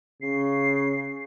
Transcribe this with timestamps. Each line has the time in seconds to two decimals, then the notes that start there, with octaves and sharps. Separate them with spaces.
0.22 C#3 C7